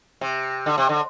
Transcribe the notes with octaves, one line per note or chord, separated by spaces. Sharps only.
C3
D3
C3
D3